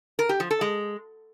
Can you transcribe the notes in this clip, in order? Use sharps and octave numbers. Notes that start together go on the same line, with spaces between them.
A#4
G4
F3
A4
G#3